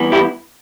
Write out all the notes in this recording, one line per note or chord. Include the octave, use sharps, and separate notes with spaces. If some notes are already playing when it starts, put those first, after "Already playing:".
Already playing: G2 E3 B3
E4 G4